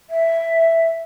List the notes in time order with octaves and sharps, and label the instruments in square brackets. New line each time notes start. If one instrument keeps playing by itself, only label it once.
[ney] E5